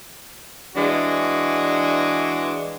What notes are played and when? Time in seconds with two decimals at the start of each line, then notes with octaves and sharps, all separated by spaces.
0.75 E3 G#3 D4 F#4